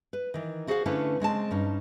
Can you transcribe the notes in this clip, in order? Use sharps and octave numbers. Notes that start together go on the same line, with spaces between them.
B4
D#3 E3
E4 F#4 G#4 B4 C5 F5
D3 A3 C#4 E4 B4 F5
C#3 G#3 C4 A5
G2 C#4 D#4